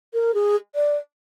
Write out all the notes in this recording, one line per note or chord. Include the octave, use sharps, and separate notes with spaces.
A#4
G#4
D5